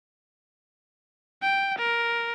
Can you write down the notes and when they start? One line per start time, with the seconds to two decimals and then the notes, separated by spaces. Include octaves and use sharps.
1.42 G5
1.78 A#4